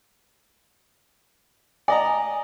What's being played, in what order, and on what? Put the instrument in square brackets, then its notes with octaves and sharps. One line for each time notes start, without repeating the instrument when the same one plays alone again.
[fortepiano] D5 D#5 A#5 [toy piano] G#5